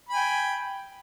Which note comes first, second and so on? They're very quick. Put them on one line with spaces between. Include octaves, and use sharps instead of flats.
B5 G#5 G5